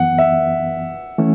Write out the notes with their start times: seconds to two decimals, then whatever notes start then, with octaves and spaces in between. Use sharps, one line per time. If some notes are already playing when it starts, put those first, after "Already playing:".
Already playing: F#2 E3 B3 F#5
0.18 E5
1.18 E3 A3 C#4